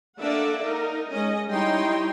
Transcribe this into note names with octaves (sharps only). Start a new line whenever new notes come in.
A#3 D4 A4 D5 E5 F#5
D#4 A#4
G#3 C#4 D#5
G3 D#4 E4 C#5 G5 C6